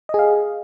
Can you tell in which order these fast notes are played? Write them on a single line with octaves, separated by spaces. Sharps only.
D#5 G#4 F5